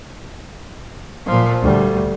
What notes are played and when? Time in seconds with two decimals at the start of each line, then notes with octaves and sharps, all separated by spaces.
1.26 A#2 F3
1.62 D2 G3